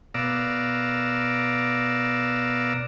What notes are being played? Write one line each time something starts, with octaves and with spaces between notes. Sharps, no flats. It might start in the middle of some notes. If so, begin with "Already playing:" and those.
B2 D5 F5 A#5 E6